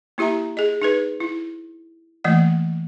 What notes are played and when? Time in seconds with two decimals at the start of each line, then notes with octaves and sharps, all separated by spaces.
0.18 A#3 E4 G4 E5 A#5
0.57 G#4 D#5
0.82 D#4 G#4 B4
1.20 E4
2.24 E3 A3 A#3 D#5 F#5